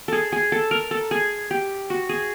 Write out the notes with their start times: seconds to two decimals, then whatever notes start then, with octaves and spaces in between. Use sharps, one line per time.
0.08 G#4 A4
0.32 G#4
0.52 A4
0.71 A#4
0.91 A4
1.11 G#4
1.51 G4
1.90 F#4
2.09 G#4